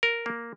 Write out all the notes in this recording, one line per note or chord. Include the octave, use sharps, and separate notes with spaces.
A#4
A#3